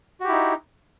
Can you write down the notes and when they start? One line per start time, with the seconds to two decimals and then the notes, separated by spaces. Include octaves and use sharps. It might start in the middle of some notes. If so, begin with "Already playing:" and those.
0.20 F#4
0.24 G4
0.28 E4
0.32 D#4